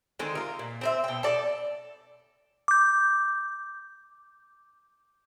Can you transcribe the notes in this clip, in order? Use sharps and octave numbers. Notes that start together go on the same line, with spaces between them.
D3 D#3 G#3 C4
F4 A#4
A#2
C4 C5 E5
B2 G5
A4 D5
D6 G6